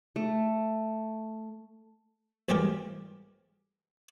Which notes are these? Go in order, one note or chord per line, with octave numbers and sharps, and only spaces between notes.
A3
B1 E2 G3 G#3 G4 A#4